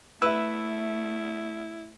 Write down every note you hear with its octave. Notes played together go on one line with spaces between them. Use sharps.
A3 E4 B4 E5 E6